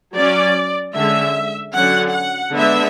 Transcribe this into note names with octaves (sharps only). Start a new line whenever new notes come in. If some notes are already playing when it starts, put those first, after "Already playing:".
F#3 C#4 D5
D3 G#3 C#4 E5
D3 F#3 C#4 F#5
F#5
D3 G#3 B3 E5